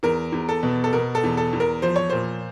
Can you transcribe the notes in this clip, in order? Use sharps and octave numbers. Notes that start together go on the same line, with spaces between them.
E2 A#4
E2
A4
B2
A4
B2 A#4
A4
E2
A4
E2
A#4
F3 C5
C#5
A#2 C5